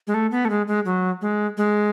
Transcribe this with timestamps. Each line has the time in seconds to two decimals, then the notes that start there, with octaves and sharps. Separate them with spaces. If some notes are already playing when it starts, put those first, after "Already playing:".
0.07 G#3
0.14 A3
0.31 B3
0.45 A3
0.50 G#3
0.67 G#3
0.85 F#3
1.21 G#3
1.57 G#3